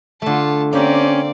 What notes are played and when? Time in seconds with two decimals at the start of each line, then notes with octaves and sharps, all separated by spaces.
0.22 D3 A3 F4 A5
0.73 A#3 C4 C#4 G4 A#4 D5